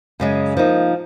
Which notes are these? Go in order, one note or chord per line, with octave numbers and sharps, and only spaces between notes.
F#2 C#3 G#3
F3 A#3 D#4